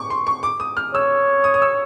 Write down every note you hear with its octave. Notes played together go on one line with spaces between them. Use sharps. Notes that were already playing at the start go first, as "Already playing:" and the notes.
Already playing: C#6 D6
C6
C#6
D6
D#6
F6
C#5 E6
D#6
D#6
E6